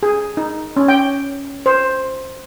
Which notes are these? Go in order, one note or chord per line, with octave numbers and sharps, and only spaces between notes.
G#4
D#4
C#4
G5
C5